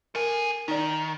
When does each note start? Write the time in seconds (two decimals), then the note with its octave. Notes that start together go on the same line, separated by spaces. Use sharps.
0.15 A4 A#4 G#5
0.68 D#3 D#4 D5